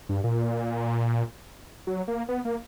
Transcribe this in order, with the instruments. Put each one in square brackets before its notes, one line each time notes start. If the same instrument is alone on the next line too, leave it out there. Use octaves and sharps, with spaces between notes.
[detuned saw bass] G2
A#2
F#3
A#3
B3
A#3